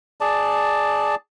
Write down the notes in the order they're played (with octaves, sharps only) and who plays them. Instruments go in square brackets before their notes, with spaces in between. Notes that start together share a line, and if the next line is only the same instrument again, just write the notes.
[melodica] G#4 D5 A5